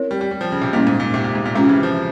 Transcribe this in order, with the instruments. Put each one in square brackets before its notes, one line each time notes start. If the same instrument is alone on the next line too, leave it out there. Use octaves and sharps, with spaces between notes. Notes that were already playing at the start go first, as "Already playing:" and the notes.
Already playing: [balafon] C4 E4 A#4 C#5
[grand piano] G3
G3
G3
F3
C#3
C3
[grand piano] A#2 [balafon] G3 A#3 C#4 E4
[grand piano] G#2
A#2
C3
A#2
G#2
A#2
[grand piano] C3 [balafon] G#3 C#4 F4
[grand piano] C#3
E3
F3